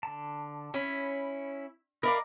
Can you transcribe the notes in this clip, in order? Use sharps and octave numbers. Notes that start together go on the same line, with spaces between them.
D3 A5
C#4 E4 B5
A#4 D5 D#5 F5 A#5 B5 D6